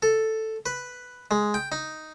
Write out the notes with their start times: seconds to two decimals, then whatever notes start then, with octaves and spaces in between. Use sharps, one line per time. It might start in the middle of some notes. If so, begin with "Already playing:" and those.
0.03 A4
0.66 B4
1.31 G#3
1.54 G5
1.72 D#4